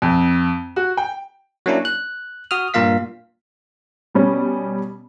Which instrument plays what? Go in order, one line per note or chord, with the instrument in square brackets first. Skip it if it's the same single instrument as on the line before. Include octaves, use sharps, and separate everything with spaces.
[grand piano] F2
F#4
G5
[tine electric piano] F#3 A#3 C#4 D4 E4
F#6
F#4 D#6 F6
G2 A#2 A#3 F4 F5 B6
[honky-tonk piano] B2 G3 C#4